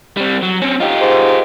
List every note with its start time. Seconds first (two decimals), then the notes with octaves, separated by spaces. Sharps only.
0.17 G3 C4
0.42 F#3
0.62 C4 C#4
0.80 D#4 F4 G4
1.01 G#2